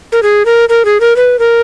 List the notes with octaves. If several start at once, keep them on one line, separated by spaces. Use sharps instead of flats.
A#4
G#4
A#4
A#4
G#4
A#4
B4
A#4